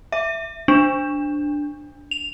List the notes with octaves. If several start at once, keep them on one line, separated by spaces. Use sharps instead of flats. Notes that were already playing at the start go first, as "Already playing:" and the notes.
E5
D4
F7